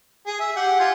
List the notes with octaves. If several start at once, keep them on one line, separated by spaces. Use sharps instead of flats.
G#4
E5
G4 F#5
F4 G#5